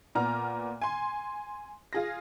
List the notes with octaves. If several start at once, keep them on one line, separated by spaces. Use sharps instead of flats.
A#2 B3 D5 A#5 F6
G#5 C6
F4 G#4 A#6